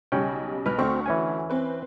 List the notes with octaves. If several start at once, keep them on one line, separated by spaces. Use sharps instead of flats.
B1 C#3 G3 C#4 G5
B1 B4 F6
D2 A3 C4 C#6
E3 C#4 G#5
C4 B4